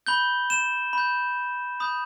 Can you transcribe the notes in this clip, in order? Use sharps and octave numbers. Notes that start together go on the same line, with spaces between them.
B5 G6 G7
E7
B5 G6
B5 D#6 G6